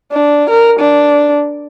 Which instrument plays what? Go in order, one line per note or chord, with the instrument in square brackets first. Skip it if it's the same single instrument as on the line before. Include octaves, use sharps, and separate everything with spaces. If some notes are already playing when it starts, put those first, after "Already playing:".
[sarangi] D4
A#4
D4